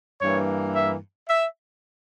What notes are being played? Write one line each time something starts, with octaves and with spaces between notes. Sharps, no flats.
G2 E3 A#3 C#5
E5
E5